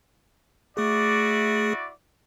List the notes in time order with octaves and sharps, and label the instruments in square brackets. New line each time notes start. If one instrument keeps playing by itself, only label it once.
[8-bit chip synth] A3 G#4 [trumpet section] E4 F#4 D5